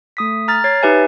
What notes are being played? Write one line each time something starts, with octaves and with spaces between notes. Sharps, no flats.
A3 D#6 B6
A#5 F6 A6
C#5 G#6 A6 C7
D#4 G4 B4 E5 G#5